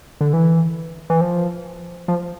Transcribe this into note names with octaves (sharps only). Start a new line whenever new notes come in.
D3
E3
E3
F3
F3